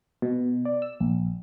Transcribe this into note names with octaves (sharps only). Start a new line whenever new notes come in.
B2
D5
E6
A#1